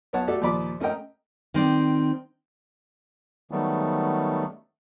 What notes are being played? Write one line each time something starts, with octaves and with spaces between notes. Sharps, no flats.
B1 B3 C#5 F#5 A5
A3 F#4 G4 A4 D5
D#2 A#2 F3 D5 B5 D6
A3 C#4 A#4 D#5 G5
D#3 C4 D5
D#3 F#3 G3 A3 B3